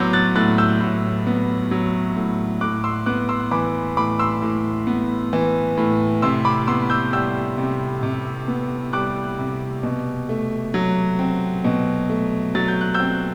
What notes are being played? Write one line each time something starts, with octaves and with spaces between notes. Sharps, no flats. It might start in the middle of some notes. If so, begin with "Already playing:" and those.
Already playing: A2 F#3 B3 C6 D6 E6 G6
F#6 A6
A2 F#6 A6
E6 G6
A2
B3
F#3
A2
A2 D6 F#6
C6 E6
B3 D6 F#6
C6 E6
E3 B5 D6
A2 B5 D6
C6 E6
A2
B3
E3
A2
C3 C6 E6
B5 D6
B3 C6 E6
E6 G6
G3 E6 G6
C3
C3
B3
G3 D6 F#6
C3
B2
A3
F#3
C4
B2
A3
F#3 A6
G6
F#6
E6 G6
C4